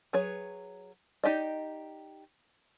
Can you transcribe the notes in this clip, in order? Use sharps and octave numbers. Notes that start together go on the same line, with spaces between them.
F#3 G#4 B4 C#5
D#4 G4 D5 D#5